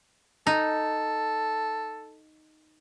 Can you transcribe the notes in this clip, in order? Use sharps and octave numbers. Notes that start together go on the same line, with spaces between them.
D#4 A4